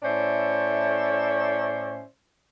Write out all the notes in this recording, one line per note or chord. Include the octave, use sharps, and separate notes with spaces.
A2 C#4 C5 D5 E5